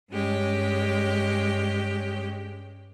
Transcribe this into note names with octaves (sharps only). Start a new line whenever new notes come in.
G2 G#3 C#4 G4